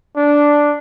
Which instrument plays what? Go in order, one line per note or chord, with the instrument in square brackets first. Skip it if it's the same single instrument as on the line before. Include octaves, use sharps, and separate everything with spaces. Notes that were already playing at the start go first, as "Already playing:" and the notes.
[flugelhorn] D4